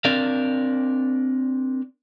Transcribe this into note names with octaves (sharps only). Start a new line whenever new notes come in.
C4 D4 A#4 D5 F5